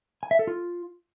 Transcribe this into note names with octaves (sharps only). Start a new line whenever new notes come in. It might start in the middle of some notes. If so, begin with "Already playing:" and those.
G#5
E5
A4
F4